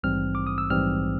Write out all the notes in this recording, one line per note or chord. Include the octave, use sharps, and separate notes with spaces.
A#1 G#2 E3 G3 C4 F6
D6
D#6
E6
A#1 G#2 E3 G3 C4 F6